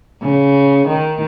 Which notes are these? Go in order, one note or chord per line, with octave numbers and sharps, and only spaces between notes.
C#3
D#3